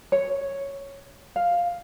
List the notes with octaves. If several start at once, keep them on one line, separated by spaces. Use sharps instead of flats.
C#5
F5